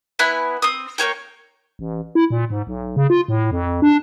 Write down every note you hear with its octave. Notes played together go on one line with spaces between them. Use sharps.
B3 E4 G#5 F#6
C4 D#6
A#3 C5 C#5 G5
A1
E4
A#2
G#2
B1
C#3
F4
A2
F2
D4